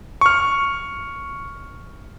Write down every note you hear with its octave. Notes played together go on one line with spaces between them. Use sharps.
C#6 F6